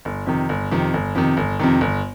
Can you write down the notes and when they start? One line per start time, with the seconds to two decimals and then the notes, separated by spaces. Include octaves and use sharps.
0.05 G1
0.26 F2 C3 D#3
0.49 G1
0.71 F2 C3 D#3
0.94 G1
1.15 F2 C3 D#3
1.37 G1
1.60 F2 C3 D#3
1.81 G1